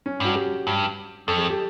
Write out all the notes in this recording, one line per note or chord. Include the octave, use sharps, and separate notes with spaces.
C#4
G2 F#4
G4
G2
F2 A4
G#4
G4